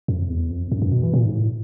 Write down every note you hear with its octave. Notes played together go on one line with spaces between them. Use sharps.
F2
E2
F2
F2
G2
F#2
B2
E3
A#2
G#2
A2